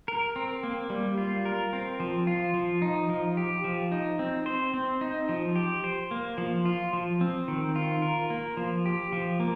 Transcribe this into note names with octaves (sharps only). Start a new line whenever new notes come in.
A#4
C4
A#3
G3
F4
A#4
C4
F3
F4
F3
D#4
F3
G4
F3
D#4
C4
C5
C4
D#4
F3
G4
C5
A#3
F3
F4
F3
C4
D#3
F4
A#4
A#3
F3
G4
F3
A#3